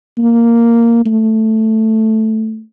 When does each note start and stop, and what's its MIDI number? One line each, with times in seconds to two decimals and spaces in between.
0.18 1.05 58
1.06 2.62 57